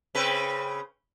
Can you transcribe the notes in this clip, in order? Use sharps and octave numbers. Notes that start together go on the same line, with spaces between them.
C#3 C4 B4